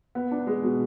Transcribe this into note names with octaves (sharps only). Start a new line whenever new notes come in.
B3
D4
G#3
B2